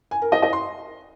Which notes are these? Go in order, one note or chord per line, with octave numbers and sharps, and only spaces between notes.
G#5
A#4
D#5
D#5
C6